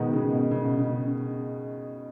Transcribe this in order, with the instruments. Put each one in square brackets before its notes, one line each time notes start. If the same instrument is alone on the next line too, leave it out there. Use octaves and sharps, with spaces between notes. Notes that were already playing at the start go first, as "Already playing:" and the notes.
Already playing: [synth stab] B2 B3 D#4 [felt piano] D#3 G#3
[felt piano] C#3
B2
C#3
B2
C#3